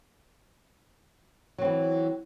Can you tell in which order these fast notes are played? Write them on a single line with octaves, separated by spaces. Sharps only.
F#3 C4 E3